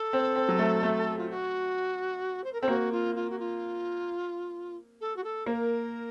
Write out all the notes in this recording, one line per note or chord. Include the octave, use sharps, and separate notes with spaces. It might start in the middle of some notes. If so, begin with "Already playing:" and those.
Already playing: A4
C4
C4
F#3
A3
A3
F4
F#4
C5
A#4
C4 A4
A#3 F#4
F4
F4
F#4
F4
A4
F#4
A4
A#3 A#4